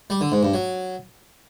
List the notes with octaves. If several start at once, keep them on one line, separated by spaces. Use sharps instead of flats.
G3
D3
G#2
G2
F#3